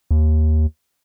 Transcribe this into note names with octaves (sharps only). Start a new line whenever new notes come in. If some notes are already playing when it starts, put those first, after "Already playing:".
D#2